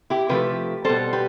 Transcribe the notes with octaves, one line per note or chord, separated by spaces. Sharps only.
E4 G4
C3 F3 A3 G4 B4
B2 G3 A4 C5
G4 B4